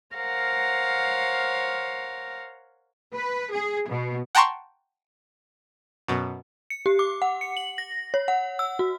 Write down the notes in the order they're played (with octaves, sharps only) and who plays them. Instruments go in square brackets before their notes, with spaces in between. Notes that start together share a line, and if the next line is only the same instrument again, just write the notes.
[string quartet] A#4 C5 C#5 F5 F#5
[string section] B4
G#4
B2
[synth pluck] F#5 G5 A5 A#5 C6 C#6
F#2 B2
[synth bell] C#7
G4
D6
F#5
C#7
F#7
A#6
C#5
F#5
E6
F#4